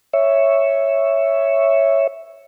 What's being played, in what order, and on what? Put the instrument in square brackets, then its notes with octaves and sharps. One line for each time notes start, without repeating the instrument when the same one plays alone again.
[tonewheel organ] C#5 E5